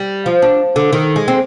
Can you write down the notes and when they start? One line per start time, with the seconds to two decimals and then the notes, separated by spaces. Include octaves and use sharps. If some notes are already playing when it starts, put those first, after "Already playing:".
Already playing: G3
0.26 F3
0.42 D4
0.76 D3
0.93 D#3
1.16 G#3
1.28 C4